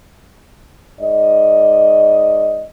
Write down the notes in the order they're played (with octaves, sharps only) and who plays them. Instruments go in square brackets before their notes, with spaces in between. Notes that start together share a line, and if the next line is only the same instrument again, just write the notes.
[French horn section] G#2 D5 D#5